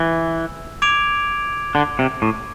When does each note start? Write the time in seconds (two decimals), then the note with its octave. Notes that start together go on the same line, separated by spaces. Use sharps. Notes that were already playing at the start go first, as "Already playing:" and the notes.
Already playing: E3 E6
0.82 D6 G#6 D7 F7
1.75 D3
1.99 C3
2.22 A2